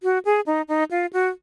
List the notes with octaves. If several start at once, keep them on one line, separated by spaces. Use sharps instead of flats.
F#4
G#4
D#4
D#4
F4
F#4